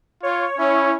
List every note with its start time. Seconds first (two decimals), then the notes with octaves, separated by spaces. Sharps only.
0.23 F4 C#5
0.58 C#4 E4 C#5